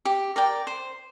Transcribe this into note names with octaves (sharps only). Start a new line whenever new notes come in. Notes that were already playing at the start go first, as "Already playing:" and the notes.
G4
A#4 D5 G5
C5